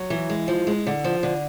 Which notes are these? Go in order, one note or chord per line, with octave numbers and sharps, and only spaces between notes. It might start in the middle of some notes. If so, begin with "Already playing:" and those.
Already playing: F#3
E3
G#3
F3
G#3
D3
F3
D3